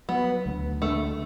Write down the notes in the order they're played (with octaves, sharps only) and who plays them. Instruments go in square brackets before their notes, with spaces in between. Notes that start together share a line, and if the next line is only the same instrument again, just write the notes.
[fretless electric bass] F#3 [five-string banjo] B3
[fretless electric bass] D2
[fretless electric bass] D3 [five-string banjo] A3